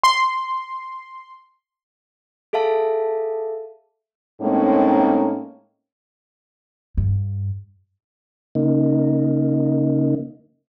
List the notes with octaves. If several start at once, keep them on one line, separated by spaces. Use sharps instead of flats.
C6
G#4 A4 E5 F5 A5
A2 G#3 A#3 C4 C#4 D#4
G2
C#3 A#3 D#4